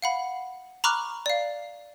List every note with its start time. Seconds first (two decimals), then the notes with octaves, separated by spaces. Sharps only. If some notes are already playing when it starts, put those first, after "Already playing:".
0.02 F5 F#5 B5
0.84 A#5 B5 C#6 D6 F6 F#6
1.26 D5 F5